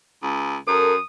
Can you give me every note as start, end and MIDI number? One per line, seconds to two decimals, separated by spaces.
0.23 0.56 37
0.68 0.95 42
0.68 0.93 69
0.68 0.93 70
0.68 1.02 87